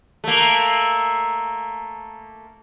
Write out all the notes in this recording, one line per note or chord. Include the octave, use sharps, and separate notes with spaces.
A3 A#3